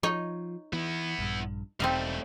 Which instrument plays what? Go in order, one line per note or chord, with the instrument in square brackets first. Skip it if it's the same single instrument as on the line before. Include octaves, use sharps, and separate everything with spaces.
[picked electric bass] F3 [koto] D#4 C#5 D#5
[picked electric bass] E3 [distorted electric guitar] B3 E4
[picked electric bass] A#1 G2
[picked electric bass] E1 [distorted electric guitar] G3 A3 [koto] C4 D#4 F5